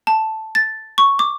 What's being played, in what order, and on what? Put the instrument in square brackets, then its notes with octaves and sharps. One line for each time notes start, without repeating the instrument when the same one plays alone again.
[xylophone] A5
A6
C#6
D6